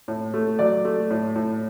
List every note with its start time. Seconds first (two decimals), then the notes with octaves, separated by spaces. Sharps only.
0.08 A2
0.34 A3
0.59 F#3 D5
0.85 A3
1.11 A2
1.36 A2